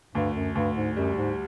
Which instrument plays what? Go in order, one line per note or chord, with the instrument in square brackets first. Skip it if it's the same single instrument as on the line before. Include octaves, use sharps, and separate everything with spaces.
[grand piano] D2 [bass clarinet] G2
[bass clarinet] F#2
[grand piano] D2 [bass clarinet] G2
[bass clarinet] G#2
[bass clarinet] F#2 [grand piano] G3
[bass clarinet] G#2